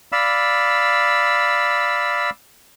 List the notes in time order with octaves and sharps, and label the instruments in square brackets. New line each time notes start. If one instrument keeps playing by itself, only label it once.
[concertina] D5 F5 B5 E6